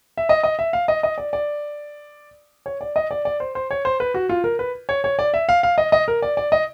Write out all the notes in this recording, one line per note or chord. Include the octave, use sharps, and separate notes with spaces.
E5
D#5
D#5
E5
F5
D#5
D#5
D5
D5
C#5
D5
D#5
D5
D5
C5
C5
C#5
C5
B4
F#4
F4
A#4
B4
C#5
C#5
D5
E5
F5
F5
D#5
D#5
A#4
D5
D5
D#5